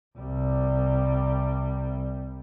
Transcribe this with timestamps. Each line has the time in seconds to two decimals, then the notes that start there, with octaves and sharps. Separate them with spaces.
0.18 C2 G3